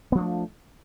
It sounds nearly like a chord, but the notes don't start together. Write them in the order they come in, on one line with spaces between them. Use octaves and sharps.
B3 F3 D4 A3